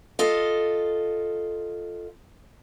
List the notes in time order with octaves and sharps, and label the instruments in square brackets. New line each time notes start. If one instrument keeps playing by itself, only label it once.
[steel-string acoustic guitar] F4 A4 D#5 F5